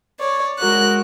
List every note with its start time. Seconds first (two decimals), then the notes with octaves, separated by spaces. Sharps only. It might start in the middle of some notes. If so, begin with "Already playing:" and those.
0.20 C#5 D5
0.58 G#3 F#4 A#4 F#6